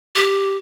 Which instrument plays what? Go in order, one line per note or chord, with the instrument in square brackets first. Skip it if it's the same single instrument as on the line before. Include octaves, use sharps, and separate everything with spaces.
[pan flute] G4